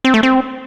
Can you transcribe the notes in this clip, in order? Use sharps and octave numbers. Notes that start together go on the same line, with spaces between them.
C4
A3
C4